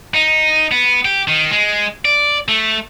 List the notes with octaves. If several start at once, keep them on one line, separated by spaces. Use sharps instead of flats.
D#4
B3
G4
D#3
G#3
D5
A3